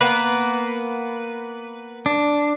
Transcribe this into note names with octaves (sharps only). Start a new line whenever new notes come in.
A#3 B3 B4
D4